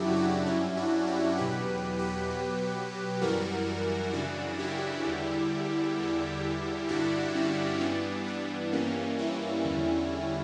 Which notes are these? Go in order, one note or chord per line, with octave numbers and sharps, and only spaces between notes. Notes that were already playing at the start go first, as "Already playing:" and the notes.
Already playing: F#2 C#3 F#3 D4 E4 F#4 G4
D4 F#4
G2 F#3 C#4 E4
D4 F#4
E4 G4
E2 B2 F#3 G4 B4
G4 B4
B2 F#3
F#2 E3 G3 F#4 A#4
F#2 C#3 E3 D4 F#4
E4 G4
E2 D3 G3
E2 D3 G3
G2 D3 G3 D4 F#4
C#4 E4
G2 E3 G3 B3 D4
B3 D4
G2 E3 G3 A#3 C#4
C#4 E4
E2 D3 G3